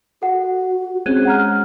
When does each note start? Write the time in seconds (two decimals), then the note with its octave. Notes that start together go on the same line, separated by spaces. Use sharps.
0.22 F#4 A4 F#5
1.06 G#3 C4 C#4 F#6 G#6 D#7
1.25 F#5 A#5 F6